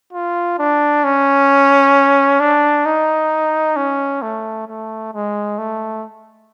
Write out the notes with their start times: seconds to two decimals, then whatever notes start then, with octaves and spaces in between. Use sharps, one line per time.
0.13 F4
0.59 D4
1.04 C#4
2.40 D4
2.86 D#4
3.76 C#4
4.22 A3
4.68 A3
5.13 G#3
5.58 A3